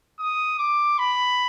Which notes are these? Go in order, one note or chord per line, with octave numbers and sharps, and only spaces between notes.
D#6
D6
B5